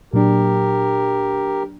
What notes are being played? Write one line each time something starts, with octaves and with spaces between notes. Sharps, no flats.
A#2 F#3 D4 G4 A#4